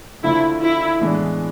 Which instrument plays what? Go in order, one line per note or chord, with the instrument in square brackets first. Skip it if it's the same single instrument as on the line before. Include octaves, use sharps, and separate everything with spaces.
[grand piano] D3 F3 A3 [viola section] E4
[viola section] E4
[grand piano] A2 E3 G#3 B3 D4